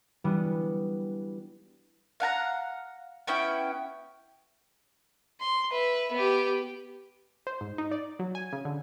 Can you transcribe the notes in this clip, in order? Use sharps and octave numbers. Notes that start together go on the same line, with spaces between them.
E3 G3 B3 D4 F#4
F5 F#5 A5 A#5
B3 C#4 E4 G5
C6
B4 E5
B3 G4
C5
G#2
D#4
D5
F#3
G#5
C#3
D3